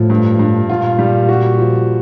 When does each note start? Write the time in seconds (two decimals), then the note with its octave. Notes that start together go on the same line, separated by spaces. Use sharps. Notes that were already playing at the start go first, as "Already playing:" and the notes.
Already playing: A2 F3
0.10 G2
0.39 G2
0.69 A#2 F4
0.99 G3
1.29 F#4
1.58 F3